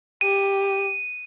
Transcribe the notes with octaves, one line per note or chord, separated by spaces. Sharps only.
G4 D#7